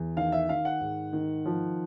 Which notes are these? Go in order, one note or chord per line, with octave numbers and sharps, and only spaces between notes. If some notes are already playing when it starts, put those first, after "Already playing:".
Already playing: E2
D#3 F5
E5
D#3 F5
F#5
G#2
D#3
F3